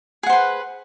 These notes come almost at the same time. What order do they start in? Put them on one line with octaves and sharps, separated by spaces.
G#4 F#5 C5 B4